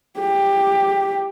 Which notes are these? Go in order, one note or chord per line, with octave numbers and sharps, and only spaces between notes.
G4